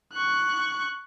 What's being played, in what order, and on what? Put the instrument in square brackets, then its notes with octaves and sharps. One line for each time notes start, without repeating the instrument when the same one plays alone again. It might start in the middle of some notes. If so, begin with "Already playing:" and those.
[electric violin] C#6 F#6